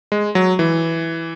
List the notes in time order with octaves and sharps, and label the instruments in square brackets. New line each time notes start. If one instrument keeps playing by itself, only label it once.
[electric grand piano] G#3
F#3
E3